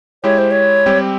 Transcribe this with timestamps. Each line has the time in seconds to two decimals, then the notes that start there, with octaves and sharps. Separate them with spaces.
0.24 G#3 E4 G4 C#5
0.38 C5
0.51 C#5
0.86 G3 C4 G4